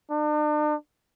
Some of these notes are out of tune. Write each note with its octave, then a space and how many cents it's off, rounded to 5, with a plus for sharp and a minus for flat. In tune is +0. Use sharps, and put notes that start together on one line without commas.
D4 +40